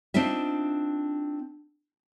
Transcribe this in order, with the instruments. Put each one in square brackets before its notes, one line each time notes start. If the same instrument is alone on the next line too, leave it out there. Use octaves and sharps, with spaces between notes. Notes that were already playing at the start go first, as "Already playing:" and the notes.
[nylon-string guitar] C4 D4 D#4 F4 E5